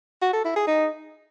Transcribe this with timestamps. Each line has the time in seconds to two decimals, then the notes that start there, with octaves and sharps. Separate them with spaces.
0.22 F#4
0.33 A4
0.45 E4
0.56 G#4
0.67 D#4